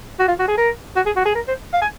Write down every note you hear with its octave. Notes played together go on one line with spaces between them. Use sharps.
F#4
F4
F#4
G#4
A#4
F#4
G#4
F#4
G#4
A#4
C5
F5
G#5